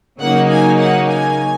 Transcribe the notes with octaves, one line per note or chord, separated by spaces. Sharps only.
C#3 F#3 A#3 D#4 F#5
G#5
F#5
G#5